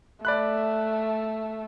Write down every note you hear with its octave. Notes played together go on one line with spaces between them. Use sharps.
A3 D5 B5 F#6